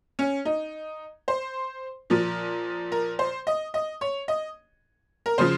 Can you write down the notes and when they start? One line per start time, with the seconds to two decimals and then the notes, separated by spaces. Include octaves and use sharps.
0.19 C#4
0.45 D#4
1.28 C5
2.10 A#2 F3
2.92 A#4
3.19 C5
3.47 D#5
3.74 D#5
4.01 C#5
4.28 D#5
5.26 A#4
5.38 C#3 F3 C5